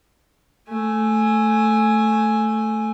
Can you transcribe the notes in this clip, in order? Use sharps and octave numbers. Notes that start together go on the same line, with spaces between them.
A3 G#5